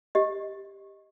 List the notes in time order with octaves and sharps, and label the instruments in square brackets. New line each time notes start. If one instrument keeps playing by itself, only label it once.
[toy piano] G4 D#5